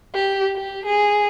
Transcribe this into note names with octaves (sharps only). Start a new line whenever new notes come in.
G4
G4
G#4